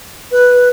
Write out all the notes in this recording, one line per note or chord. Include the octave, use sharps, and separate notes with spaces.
B4